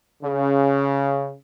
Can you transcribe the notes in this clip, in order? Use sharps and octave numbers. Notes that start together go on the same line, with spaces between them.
C#3